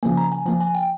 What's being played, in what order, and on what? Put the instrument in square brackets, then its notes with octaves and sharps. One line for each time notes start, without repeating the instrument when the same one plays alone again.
[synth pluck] C#3 F3 A#3 [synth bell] G#5
[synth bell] A#5
G#5
[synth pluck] F3 A#3 F4 [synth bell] G#5
[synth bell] G#5
G5